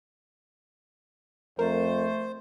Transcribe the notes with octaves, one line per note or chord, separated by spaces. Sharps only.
F2 A3 A#4 C5